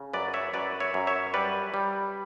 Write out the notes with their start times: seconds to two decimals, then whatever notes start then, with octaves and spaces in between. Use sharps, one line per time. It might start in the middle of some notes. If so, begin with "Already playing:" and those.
Already playing: C#3
0.13 F#2 B4 D5
0.34 C#5 E5
0.54 F#2 B4 D5
0.80 C#5 E5
0.94 F#2
1.07 C#5 E5
1.34 G3 B4 D5
1.74 G3